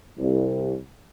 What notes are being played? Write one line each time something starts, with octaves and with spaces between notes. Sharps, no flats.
C2